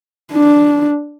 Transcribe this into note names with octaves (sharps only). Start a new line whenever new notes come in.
D4